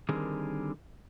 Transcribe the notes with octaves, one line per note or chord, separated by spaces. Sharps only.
D3 D#3 G3 C4 G#4 A#4